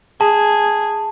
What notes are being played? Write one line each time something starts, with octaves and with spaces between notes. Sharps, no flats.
G#4 A5